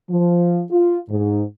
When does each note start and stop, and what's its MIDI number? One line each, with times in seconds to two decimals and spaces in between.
0.10 0.62 53
0.71 0.99 65
1.10 1.42 44